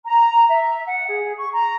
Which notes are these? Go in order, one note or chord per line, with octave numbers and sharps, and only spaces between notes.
A#5
E5
F#5
G#4
C#6
A#5